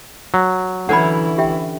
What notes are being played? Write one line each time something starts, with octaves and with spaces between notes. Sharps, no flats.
F#3
D3 E3 C#4 E4 C#5 F#5 B5
G4 E5 G5